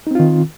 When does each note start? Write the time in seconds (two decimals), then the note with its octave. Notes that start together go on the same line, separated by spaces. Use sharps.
0.07 D#4
0.11 C4
0.15 F4
0.20 D#3